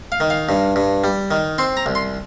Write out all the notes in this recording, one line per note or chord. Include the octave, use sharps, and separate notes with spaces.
F5
D#3
F5
G2
G2
G3
D#3
C4 C6
A#5
C2
C6